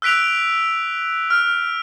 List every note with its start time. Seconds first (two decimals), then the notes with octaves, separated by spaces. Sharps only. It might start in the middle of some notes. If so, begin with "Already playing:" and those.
0.02 E6 F#6 B6 D7 F7
1.30 F6